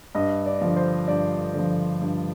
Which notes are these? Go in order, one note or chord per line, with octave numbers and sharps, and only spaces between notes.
G2 D#5
D5
D3 F3
C5
G2 D5
D3
F3
G2